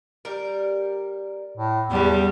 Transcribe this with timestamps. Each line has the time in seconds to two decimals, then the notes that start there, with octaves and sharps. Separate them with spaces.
0.25 G3 A#4
1.57 A2
1.91 E2 C#3 G3 B3 C#4